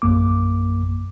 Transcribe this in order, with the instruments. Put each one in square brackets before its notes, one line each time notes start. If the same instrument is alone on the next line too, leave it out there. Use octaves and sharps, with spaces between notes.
[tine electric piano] A#1 F#2 A#3 D6